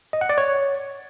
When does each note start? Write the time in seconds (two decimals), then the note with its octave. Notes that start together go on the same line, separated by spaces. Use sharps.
0.13 D#5
0.21 F#5
0.29 D5
0.38 C#5